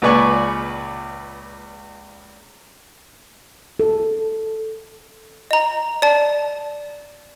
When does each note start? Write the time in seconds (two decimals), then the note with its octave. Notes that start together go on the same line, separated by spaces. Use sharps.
0.02 C#2 A#2 B4 D5 G#5 C#6
3.80 A4
5.51 D#5 A#5
6.02 D5 A5